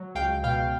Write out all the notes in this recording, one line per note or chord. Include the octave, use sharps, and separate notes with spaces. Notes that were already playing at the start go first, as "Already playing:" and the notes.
Already playing: F#3
C#2 F5 G5
B2 F5 G5